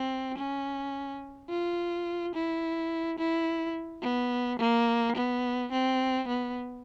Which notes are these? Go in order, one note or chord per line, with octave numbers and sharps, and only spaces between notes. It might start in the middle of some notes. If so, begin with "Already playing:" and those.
Already playing: C4
C#4
F4
E4
E4
B3
A#3
B3
C4
B3